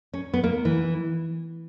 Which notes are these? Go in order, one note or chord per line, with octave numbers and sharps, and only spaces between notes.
C#4
B3
A#3
E3